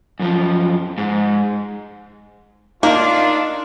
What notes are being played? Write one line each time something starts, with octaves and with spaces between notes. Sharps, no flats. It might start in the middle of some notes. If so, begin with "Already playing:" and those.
F#2 F3
G#2
A#3 D4 D#4 F4